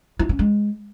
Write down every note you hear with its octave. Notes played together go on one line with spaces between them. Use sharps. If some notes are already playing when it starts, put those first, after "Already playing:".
E4
C#4
G#3